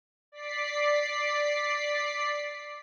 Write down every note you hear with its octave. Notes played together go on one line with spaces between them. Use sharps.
D5 B6 C7